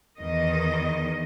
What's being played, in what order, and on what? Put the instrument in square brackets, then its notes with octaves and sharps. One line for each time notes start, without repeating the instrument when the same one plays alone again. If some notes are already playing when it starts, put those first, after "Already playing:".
[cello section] E2 D#3 D#5